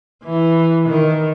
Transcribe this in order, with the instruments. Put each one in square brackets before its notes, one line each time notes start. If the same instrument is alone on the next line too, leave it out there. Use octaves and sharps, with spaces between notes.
[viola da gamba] E3
D#3